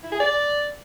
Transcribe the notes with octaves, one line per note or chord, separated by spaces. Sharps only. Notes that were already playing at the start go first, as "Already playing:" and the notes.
E4
G#4
D5